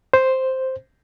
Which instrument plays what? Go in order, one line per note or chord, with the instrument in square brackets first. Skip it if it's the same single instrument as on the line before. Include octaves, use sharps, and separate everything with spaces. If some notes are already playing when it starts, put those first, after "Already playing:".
[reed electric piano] C5